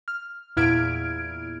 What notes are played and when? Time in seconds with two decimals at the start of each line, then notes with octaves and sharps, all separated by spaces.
0.08 F6
0.57 E2 A#2 E4 F6 G#6 D7